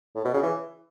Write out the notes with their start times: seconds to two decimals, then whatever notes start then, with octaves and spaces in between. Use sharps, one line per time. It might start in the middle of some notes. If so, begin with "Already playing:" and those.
0.15 A2
0.25 B2
0.34 C#3
0.43 E3